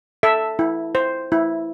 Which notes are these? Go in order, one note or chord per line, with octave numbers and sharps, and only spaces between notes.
A4 E5
E4
C5
E4